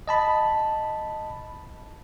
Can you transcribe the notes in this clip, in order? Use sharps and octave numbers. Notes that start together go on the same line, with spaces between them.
D#5 A5 B5